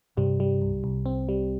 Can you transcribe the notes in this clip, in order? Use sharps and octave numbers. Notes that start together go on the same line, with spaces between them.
G2 C3 G3
G3
C2
C2
C4
G3